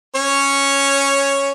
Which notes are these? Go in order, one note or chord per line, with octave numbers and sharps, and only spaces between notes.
C#4 C#5